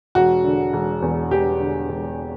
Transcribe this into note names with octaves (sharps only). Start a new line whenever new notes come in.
E1 F#4
D3
E1
E2
E1 G4
D3
E1